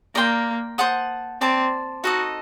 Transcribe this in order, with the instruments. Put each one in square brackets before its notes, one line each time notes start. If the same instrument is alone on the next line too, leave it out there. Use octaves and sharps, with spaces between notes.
[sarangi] A#3 [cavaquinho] A#4 D5 G5 C6
[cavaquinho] C5 F#5 A5 D#6
[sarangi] C4 [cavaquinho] D5 A5 D6
[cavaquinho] D#4 A4 D#5 [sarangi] F#4